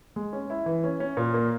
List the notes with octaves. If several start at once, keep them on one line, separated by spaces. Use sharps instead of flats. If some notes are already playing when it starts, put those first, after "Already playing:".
G#3
C#4
E4
E3
C#4
C#4
A#2
A#3